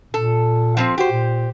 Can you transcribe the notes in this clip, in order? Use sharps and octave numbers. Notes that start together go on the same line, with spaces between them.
A#2 A4
F3 B3 C4
F#4 G4 C5
A#2